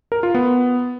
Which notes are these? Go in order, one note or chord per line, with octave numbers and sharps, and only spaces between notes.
A#4
F4
B3